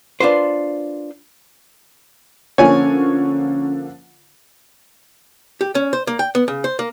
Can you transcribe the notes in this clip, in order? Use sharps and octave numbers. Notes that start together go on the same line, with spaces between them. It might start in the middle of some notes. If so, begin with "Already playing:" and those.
D4 F4 B4 C5
D3 F3 A#3 C#4 C#5 G#5
G4
C#4
C5
A#3
G5
B3
C#3
C5
A#3